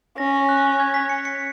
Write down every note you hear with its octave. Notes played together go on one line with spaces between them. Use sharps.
C#4 A#6
F#6
G#6
B6
C#7
C#7